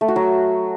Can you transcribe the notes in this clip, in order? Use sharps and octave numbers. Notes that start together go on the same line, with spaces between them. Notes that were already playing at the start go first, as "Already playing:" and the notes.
A3
F#4
F#3